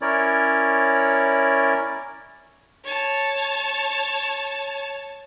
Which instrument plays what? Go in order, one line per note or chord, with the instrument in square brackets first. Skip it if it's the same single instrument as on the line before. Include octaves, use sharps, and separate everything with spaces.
[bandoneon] C#4 E4 A#4 C#5 D5
[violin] C#5 A5